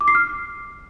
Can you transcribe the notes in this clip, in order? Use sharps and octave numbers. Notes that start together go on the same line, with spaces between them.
D6
C7
F6